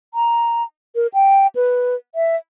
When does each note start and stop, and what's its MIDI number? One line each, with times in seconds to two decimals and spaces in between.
0.14 0.63 82
0.95 1.07 70
1.14 1.47 79
1.56 1.95 71
2.15 2.36 76